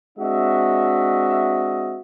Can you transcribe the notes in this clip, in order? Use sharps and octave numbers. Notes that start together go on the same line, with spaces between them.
G#3 C4 D4 F#4 D#5 E5